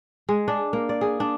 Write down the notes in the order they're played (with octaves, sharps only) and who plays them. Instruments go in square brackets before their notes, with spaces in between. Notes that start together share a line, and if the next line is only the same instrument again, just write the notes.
[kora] G#3
D4
A#3
D5
G#4
D4